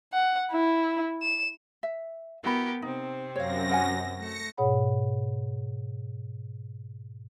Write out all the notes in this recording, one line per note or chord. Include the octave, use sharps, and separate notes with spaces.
F#5
E4
E7
E5
B3 E4 F#4 G4 A#4 B5
C3 C4 D#4
F#2 C#5 F5 A#6
A#4 F#5 G#5
A3 A#6 C#7
G#2 B2 G#4 C#5 F#5 B5